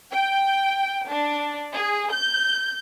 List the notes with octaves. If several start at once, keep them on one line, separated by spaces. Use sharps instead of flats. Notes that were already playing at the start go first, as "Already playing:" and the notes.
G5
D4
G#4
G6